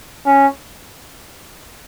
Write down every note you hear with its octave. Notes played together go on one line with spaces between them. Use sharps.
C#4